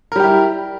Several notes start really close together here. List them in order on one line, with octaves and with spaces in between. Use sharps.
A#4 G3 G4 E4